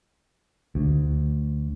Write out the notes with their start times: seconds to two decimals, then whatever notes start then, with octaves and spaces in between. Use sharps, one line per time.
0.75 D2